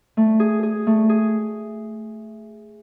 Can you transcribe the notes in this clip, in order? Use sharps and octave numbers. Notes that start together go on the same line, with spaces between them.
A3
G#4
G#4
A3
G#4